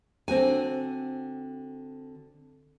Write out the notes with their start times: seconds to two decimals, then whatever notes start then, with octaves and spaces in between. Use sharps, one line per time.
0.28 D3 C4 F#4 G#5